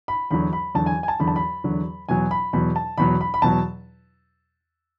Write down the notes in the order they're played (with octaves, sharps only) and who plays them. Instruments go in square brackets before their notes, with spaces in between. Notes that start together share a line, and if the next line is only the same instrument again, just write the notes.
[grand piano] B5
E2 D3 F#3 B5
B5
E2 D3 F#3 A5
G#5
G#5
A5
E2 D3 F#3 B5
A5
B5
E2 D3 F#3
E2 B2 F#3 G#5
B5
E2 B2 F#3 B5
A5
E2 B2 F#3 B5
B5
B5
E2 B2 F#3 A5